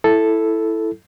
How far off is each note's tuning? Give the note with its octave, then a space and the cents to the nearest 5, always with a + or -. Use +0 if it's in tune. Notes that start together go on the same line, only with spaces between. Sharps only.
E4 +0 A4 +0